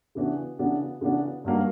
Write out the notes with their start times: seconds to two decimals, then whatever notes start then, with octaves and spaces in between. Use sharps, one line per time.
0.15 C#3 E3 B3 D4 F#4
0.59 C#3 E3 B3 D4 F#4
1.01 C#3 E3 B3 D4 F#4
1.44 G2 F#3 A#3